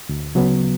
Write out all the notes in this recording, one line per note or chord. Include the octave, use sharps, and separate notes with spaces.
D2
C#3 F#3 B3